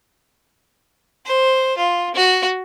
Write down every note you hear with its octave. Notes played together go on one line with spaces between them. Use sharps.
C5
F4
F#4